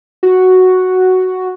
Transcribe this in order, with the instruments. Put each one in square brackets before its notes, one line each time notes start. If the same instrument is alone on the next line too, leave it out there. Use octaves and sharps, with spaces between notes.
[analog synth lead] F#4